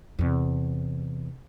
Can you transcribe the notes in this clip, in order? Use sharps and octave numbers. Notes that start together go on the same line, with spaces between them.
E2 C3